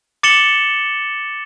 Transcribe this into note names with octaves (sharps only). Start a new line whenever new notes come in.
D6 A6 C#7 E7 F#7 G7